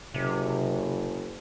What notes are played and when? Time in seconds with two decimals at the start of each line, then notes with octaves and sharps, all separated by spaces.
0.14 F#1 C3